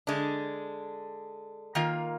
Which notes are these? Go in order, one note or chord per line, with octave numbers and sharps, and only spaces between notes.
D3 G#3 D4
D#3 A#3 F4